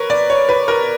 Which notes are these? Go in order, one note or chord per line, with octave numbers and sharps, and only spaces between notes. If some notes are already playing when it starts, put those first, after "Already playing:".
Already playing: A#4 B4 C#5
D5
C#5
B4
A#4